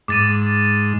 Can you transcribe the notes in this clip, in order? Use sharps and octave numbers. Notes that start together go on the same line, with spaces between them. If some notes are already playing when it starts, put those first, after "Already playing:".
G#2 D6 A6 D#7